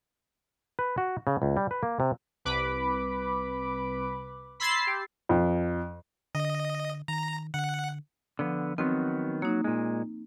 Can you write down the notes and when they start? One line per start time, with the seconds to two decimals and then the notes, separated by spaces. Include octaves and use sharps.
0.79 B4
0.98 F#4
1.27 C#3
1.42 C#2
1.57 G3
1.71 B4
1.83 A#3
2.00 C3
2.45 C2 B4 B5 D6
4.60 B5 C6 E6 G#6 A6 C7
4.87 G4
5.29 F2
6.35 D3 D#5
7.08 D#3 A#5
7.54 D3 F#5
8.39 D3 F3 B3
8.78 D#3 F#3 B3 C4
9.42 F#3 A#3 D#4
9.64 A#2 G#3